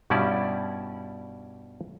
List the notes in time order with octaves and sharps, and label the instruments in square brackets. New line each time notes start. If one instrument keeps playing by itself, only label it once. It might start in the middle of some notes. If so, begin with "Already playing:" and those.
[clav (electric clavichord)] G2 B2 G3 C#4 E4 D5